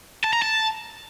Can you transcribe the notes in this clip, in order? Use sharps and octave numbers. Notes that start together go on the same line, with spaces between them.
A5
A#5
A5